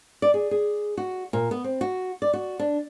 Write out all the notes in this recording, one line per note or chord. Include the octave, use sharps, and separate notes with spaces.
D5
G#4
G#4
F#4
A#2
B3
C4
F#4
D5
F#4
D4